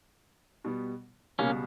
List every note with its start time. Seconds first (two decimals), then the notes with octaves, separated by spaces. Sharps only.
0.64 B2 G3 B3
1.39 C#2 B2 G3 A#3 B3 C#4